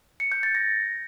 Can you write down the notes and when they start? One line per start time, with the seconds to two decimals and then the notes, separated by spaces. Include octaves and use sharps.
0.20 C#7
0.32 G6
0.43 A6
0.55 A#6